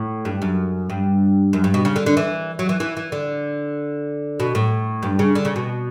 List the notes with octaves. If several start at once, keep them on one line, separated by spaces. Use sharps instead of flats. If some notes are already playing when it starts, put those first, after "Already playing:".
Already playing: A2
G2
F#2
G2
F#2
G2
B2
C#3
D3
D3
E3
F#3
E3
E3
E3
D3
B2
A2
G2
C#3
D3
C#3
B2